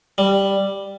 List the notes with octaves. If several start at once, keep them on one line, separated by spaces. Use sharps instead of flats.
G3